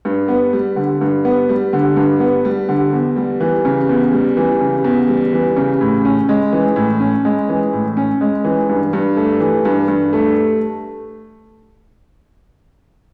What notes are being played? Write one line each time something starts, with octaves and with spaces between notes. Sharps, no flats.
G2
B3
G3
D3
G2
B3
G3
D3
G2
B3
G3
D3
E2
G3
E3
C#3
E2
G3
E3
C#3
E2
G3
E3
C#3
A2
C#4
G#3
E3
A2
C#4
G#3
E3
A2
C#4
G#3
E3
G2
G2
A3
E3
G2
G2
A3